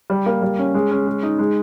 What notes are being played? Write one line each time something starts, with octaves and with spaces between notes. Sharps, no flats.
G3
A#3
G3
C#4
G#3
C#4
G#3
D#4
G#3